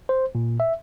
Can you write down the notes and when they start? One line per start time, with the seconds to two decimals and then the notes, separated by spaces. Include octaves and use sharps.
0.09 C5
0.35 A#2
0.60 E5